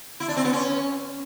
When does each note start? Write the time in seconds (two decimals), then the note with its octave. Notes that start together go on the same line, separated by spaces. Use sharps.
0.20 E4
0.28 D4
0.36 C4
0.45 B3
0.53 C#4